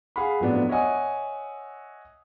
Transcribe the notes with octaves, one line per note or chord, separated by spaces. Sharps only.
G#4 F5 F#5 B5
F2 A2 F3 F#3 B3 D4
C#5 D#5 E5 F#5 G#5 D#6